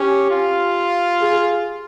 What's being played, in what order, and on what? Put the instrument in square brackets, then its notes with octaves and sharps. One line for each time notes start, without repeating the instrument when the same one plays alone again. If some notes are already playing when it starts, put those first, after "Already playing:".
Already playing: [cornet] C#4 [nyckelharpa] G4
[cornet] F4
[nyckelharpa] G#4